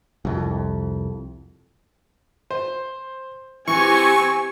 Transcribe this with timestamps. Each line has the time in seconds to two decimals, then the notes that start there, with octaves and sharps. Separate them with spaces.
0.25 C2 F2
2.51 C5
3.67 E3 C4 G4 G#5 C#6